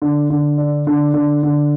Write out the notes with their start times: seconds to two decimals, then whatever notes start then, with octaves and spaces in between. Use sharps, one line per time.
0.02 D3
0.30 D3
0.58 D4
0.87 D3
1.14 D3
1.43 D3